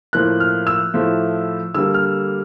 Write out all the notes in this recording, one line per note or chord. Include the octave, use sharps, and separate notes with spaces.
A2 F3 A#3 F#6
F6
E6
A2 F3 A3
D3 G3 A#3 E6
F6